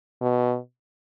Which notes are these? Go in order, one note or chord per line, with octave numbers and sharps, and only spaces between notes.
B2